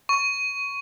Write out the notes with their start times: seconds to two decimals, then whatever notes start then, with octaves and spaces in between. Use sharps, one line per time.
0.09 C#6